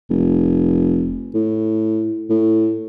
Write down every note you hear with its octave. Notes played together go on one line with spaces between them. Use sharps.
F1
A2
A2